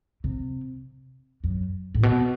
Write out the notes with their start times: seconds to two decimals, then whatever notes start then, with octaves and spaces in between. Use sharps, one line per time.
0.24 C3
1.44 F#2
1.95 A2
2.03 B2